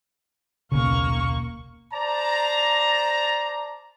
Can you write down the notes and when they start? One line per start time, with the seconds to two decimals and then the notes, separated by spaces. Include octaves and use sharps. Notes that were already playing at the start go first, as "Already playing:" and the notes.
0.72 D#1 B1 C#3 A#3 C#6
1.92 C5 D5 A5 A#5